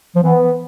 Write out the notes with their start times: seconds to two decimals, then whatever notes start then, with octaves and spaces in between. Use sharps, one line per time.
0.16 F3
0.23 E3 B3